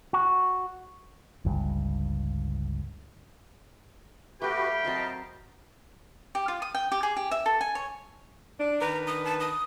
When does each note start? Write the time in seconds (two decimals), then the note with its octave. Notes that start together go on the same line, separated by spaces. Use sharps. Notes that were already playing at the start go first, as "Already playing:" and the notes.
0.13 F#4
1.45 G1 C#2 G2
4.42 A3 F#4 G4 B4 F5 G5 B5 C6
4.85 F#3 C4 A#4 D#5 A5
6.35 G4
6.48 F4
6.62 D#6
6.74 G5
6.92 G4
7.03 G#4
7.16 G4
7.31 E5
7.46 A4
7.61 G#5
7.75 C#5
8.60 D4
8.81 D#3 D4 B4 A#5
9.07 D#6
9.25 A5
9.40 D#6